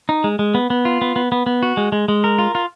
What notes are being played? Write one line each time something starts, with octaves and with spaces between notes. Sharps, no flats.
D#4
G#3
G#3
B3
B3
F4
B3
B3
B3
B3
F#4
G#3
G#3
G#3
A#4
F4
F4